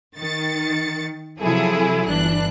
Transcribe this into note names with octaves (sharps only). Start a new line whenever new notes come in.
D#3 A6 C#7
C3 F3 F#3 E4 G#4 A4
G1 E3 D4 F#6